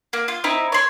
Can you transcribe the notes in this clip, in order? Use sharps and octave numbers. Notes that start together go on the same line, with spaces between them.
A#3
F4
C4 D#4 E4
C#5 C6